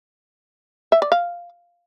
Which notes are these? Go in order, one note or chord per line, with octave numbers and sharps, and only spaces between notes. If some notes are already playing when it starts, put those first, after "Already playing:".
E5
D5
F5